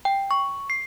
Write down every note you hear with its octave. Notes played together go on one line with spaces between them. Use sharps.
G5
C#6
C7